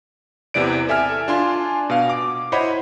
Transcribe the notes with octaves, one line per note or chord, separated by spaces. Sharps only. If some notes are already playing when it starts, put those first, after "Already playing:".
E2 C3 E3 D5 D7
A4 E5 G#5 F6
D4 F4 G#5 C6
B2 F5
D6
E4 C5 C#5 D#5 F#5 B5